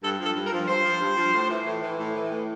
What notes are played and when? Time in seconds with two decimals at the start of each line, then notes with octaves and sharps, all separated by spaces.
0.03 G2 A4
0.20 F3
0.25 A4
0.36 G2
0.47 A#4
0.53 F3
0.68 G2 C5
0.85 F3
1.01 G2
1.17 F3
1.34 A2
1.50 E3
1.66 A2
1.82 E3
1.99 A2
2.15 E3
2.31 A2